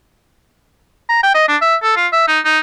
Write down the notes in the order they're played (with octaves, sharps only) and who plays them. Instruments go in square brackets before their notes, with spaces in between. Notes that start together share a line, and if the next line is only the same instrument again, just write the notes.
[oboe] A#5
G5
D#5
D4
E5
A4
F4
E5
D#4
D#4